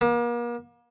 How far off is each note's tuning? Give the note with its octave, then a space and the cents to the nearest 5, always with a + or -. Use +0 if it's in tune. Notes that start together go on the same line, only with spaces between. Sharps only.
A#3 +40